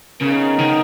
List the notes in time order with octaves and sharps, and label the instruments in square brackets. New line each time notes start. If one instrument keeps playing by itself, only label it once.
[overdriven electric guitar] C#3 [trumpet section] B3 D#4 A#4
[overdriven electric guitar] D#3